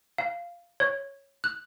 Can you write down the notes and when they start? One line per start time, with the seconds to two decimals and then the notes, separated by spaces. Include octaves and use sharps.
0.18 F5
0.80 C#5
1.44 F#6